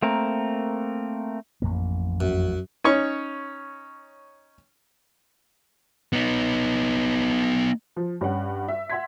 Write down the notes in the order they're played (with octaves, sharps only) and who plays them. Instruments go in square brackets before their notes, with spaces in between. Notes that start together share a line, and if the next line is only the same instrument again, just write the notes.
[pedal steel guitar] A3 A#3 C4 A#4
[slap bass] A1 F2 A#3
[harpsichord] F#2
[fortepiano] C#4 D#4 C#5 C#6
[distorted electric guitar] B3 D#4
[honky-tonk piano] F3
G2 C#4 F#5
E5
E5 F#5 C6 G#6 B6